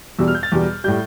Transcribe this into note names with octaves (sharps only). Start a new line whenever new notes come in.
E2 B2 G3 E6
F6
G6
A6
E2 B2 G3
A2 G3 G6